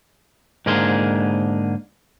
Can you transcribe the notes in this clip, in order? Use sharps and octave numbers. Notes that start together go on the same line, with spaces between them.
G#2 D3 A#3 G#4 A#4 C6